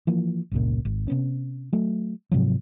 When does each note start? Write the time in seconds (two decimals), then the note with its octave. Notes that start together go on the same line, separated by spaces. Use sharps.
0.07 E3 F3 A#3
0.51 G1 C#2 A#2
0.85 G#1
1.08 C3 B3 C#4
1.73 F#3 A3
2.31 G#2 C3 F3 F#3